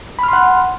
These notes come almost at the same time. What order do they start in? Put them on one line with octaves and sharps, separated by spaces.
B5 F6 C6 F#5